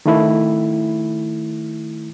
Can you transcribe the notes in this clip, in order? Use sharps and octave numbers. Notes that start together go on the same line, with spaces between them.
D#3 A3 E4